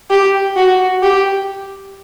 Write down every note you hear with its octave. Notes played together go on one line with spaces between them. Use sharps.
G4
F#4
G4